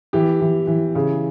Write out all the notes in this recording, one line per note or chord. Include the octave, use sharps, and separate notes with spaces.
E3 G4
E3
E3
C#3